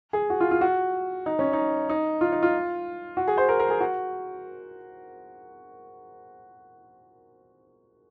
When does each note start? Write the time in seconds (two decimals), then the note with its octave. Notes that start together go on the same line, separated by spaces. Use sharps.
0.13 G#4
0.30 F#4
0.41 F4
0.51 F4
0.61 F#4
1.26 D#4
1.39 C#4
1.53 D#4
1.89 D#4
2.21 F4
2.32 D#4
2.43 F4
3.17 F#4
3.27 G#4
3.38 C5
3.49 A#4
3.60 A#4
3.70 G#4
3.80 F#4